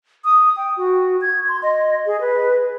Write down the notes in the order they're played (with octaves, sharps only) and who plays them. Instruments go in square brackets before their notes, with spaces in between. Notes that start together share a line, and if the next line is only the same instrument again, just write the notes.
[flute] D#6
G5
F#4
G#6
C6
D#5
G#4
B4